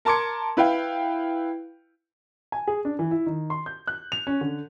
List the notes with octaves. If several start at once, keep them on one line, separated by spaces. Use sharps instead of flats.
A#4 A5 C6 D6 G#6 C#7
E4 B4 F5 G5
G#5
G#4
D4
E3
E4
D#3
C6
G6
F#6
F7
C#4
D3